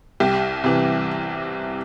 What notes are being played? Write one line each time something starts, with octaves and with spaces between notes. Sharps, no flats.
C2 G4
C3 E3